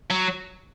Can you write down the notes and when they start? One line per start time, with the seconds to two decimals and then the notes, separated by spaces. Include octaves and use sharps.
0.10 F#3